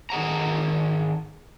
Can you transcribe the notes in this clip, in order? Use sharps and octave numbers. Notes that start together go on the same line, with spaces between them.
D#3 G#4 F#5 A#5